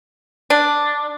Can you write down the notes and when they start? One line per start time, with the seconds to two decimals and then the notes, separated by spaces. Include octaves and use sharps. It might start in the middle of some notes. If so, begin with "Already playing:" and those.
0.50 D4